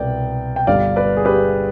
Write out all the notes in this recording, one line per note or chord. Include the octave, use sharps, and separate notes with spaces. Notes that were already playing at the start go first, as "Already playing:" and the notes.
Already playing: C2 B2 B3 D5 G5
G5
G1 G2 D3 G3 D5 F5
B4 D5
G#4
G4 B4